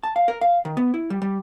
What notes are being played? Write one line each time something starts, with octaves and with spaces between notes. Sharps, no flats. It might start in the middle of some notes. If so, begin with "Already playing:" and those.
A5
F5
A#4
F5
D#3
B3
E4
G3
G3